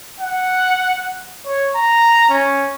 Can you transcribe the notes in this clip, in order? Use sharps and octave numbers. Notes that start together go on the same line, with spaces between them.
F#5
C#5
A#5
C#4